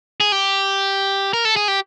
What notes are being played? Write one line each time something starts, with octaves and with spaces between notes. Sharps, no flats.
G#4
G4
A#4
A4
G#4
G4